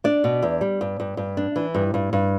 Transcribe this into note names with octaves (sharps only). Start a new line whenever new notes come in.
D4 D5
B2
E2
G3
G2
G2
G2
D4
E3
G2
G2
G2